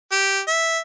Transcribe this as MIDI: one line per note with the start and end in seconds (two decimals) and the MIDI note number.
0.12 0.40 67
0.47 0.78 76